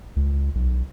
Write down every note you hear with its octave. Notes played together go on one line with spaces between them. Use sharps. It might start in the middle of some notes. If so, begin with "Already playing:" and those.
C#2
B1